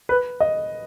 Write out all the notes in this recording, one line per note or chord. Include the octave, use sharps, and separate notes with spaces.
B4
D#5